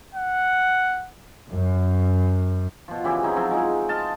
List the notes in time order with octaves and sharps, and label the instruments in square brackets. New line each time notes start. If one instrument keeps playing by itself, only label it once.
[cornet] F#5
[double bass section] F#2
[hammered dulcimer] B2 F3
C#3 E3 E4 G4
F#3 C4 D#4 E4
F3 F#3 C4 E4
G#3 D#4
D#5 F5 A5 C6